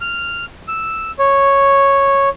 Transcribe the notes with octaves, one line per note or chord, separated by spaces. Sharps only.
F6
E6
C#5